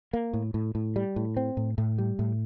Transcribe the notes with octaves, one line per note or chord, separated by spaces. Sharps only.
A#3
A2
A2
A2
G3
A2
C4
A2
A2
G3
A2